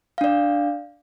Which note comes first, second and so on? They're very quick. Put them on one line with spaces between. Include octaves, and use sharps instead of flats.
F5 D4 D5